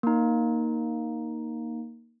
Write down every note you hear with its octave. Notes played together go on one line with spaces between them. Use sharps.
A#3 D#4